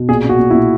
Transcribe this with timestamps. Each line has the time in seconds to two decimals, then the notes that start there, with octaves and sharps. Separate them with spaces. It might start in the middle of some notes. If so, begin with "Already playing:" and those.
Already playing: B2
0.09 A#2 G#4
0.24 A#2
0.29 F#4
0.39 A#2
0.50 E4
0.54 A#2